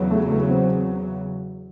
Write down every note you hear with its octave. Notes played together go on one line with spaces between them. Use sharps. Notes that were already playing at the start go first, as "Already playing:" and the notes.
Already playing: E2 C#3 F#3
A3
A3
C4